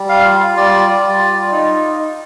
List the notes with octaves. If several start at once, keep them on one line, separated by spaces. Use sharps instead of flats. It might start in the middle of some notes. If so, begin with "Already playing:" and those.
Already playing: G3
F5
F4
G3 D5
G3
F4
D#4